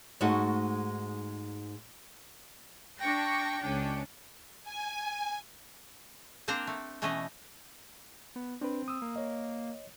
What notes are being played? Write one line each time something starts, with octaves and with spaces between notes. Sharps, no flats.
G#2 G#3 A3 D#4 F#4
D4 G5 C#6 A#6
C#2 C#4 D4
G#5
A#3 C4 D4 C5 G5 A#5
A3
B2 E3 A3 C#4 D#5
B3
C4 D4 B4
D#6 E6
A#3
C#5 D#5